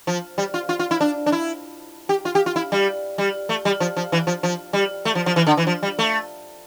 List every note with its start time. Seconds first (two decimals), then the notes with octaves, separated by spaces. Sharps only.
0.07 F3
0.38 G3
0.54 F4
0.69 F4
0.79 F4
0.91 E4
1.01 D4
1.26 D4
1.32 E4
2.09 G4
2.25 F4
2.35 G4
2.46 F4
2.56 E4
2.72 G3
3.18 G3
3.49 A3
3.65 G3
3.80 F3
3.97 F3
4.12 E3
4.27 F3
4.43 F3
4.73 G3
5.05 A3
5.15 F3
5.26 F3
5.36 E3
5.47 D3
5.57 E3
5.67 F3
5.83 G3
5.99 A3